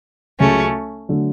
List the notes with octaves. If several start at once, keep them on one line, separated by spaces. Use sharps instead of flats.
C#2 C#3 F#3 A3 C#4
D3 F#3 A3